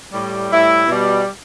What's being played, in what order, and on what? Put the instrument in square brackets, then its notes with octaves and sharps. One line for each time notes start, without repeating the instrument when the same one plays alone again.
[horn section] A2 G3
A2 G3 E4
B2 G3